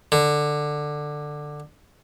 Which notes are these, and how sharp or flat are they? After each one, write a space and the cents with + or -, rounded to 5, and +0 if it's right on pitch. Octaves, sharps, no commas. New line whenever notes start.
D3 +10